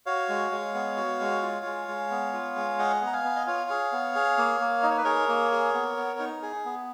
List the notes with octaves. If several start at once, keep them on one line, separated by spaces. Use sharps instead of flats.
F#4 C#5 F5
G#3
G#3
B3
F#4
G#3
F4
G#3
G#3
B3
F4
G#3
G#4 D#5 F#5
B3
A#5
F5 G#5
B3
D#5
F4 C#5 F5
G#4
B3
G#4
A#3
A#3
D#4 D#5
C#5
B4
G#4 A#4 C#5
A#3
G#4
B3
B3
D#4
G#4
B3